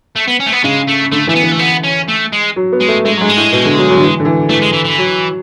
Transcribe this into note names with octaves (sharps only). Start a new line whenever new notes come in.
A3
B3
C#4
A3
B3
C#3 G#3
A3
D3 A3
E3 A3
B3
E3
A3
B3
C#4
A3
G#3
F#3
B3
G#3
A3
G#3 A3
F#3 G#3
G#3
A2
B2
D3
F#3
F#3
D3
E3
D3
E3
E3 A3
G#3
E3
E3
F#3